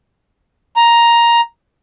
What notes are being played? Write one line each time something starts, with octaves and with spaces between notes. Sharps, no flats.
A#5